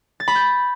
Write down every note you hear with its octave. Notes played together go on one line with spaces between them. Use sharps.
A6
B5
G6